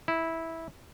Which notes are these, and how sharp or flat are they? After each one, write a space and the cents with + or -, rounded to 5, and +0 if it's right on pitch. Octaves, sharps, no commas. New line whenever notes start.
E4 -10